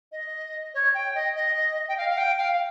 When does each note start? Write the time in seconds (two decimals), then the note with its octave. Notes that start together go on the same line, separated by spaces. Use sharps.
0.12 D#5
0.74 C#5
0.94 G5
1.15 D#5
1.35 D#5
1.88 G5
1.97 F5
2.10 F5
2.17 G5
2.38 F5